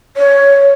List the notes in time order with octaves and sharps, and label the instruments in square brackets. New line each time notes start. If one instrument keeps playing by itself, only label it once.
[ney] C#5